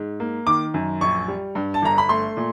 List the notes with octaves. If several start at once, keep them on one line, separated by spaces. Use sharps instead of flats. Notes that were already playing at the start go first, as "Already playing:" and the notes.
Already playing: G#2
A#3
D#3 D6
F#2
A#1 C#6
G3
G2
A5
G1 A#5
B5
A3 C6
A#2